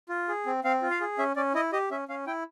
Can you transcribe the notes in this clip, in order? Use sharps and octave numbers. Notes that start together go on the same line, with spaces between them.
F4
G#4
C4
C4 F5
F4
F5
G#4
C#4 E5
C#4 D5
E4 D#5
G4 D#5
C#4 E5
C#4 F5
E4 G5